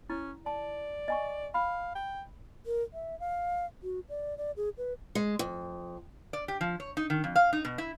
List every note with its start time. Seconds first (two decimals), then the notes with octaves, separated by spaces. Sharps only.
0.10 C#4 E4
0.46 D5 A5
1.08 D#5 G#5 C#6
1.54 F5 B5
1.96 G5
2.66 A#4
2.94 E5
3.20 F5
3.83 F#4
4.09 D5
4.38 D5
4.57 G#4
4.78 B4
5.15 G#3
5.39 F2
6.33 D5
6.48 G4
6.61 F3
6.80 C#5
6.97 D#4
7.10 D#3
7.24 F2
7.36 F5
7.53 D#4
7.65 B2
7.78 E4